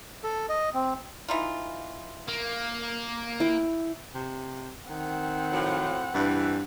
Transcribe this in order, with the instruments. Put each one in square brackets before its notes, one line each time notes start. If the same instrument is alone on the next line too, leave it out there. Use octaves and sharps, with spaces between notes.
[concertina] A4
D#5
C4
[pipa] E3 D#4 F4
[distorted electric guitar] A#3
[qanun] E4 G5
[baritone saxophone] C3
[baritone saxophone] D#3 [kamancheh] C4 F#5
[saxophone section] A2 F3 F#3
[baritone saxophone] G2 [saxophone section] E3